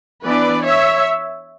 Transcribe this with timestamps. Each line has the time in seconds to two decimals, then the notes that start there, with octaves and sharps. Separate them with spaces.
0.25 E3 B3 D4 B4 D5
0.65 C#5 E5